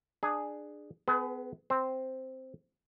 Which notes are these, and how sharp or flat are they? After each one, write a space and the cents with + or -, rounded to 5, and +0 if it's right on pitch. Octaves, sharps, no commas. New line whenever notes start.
D4 +20 G#4 +0
B3 +40 G#4 +30 B4 +0
C4 +0 C5 +0